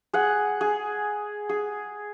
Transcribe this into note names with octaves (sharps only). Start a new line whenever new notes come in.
G#4 F#5
G#4
G#4